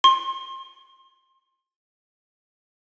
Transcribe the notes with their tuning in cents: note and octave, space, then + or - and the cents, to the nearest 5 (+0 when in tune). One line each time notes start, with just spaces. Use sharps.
C6 +25